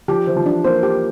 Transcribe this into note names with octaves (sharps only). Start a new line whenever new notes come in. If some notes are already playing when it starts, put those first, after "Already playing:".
F3 G4
E3 C5
F3
D4
A#3 C5
G4